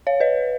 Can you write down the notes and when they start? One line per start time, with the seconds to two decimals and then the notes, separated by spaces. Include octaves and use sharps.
0.07 C#5 F5
0.20 B4 D#5